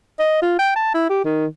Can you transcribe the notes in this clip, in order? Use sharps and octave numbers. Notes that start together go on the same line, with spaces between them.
D#5
F4
G5
A5
E4
G4
D#3